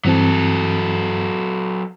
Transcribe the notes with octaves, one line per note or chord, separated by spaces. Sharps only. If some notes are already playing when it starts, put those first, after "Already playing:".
G2 E3 F#3 C4 A4